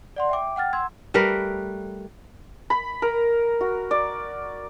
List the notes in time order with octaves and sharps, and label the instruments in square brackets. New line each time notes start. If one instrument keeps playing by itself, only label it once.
[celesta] D5 F#5 C6
E5 G5 D6
F#5 G5 F6 A6
F#5 C6 E6 G#6
[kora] G3 A3 A#4 B4
[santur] B5
A#4
F#4
D5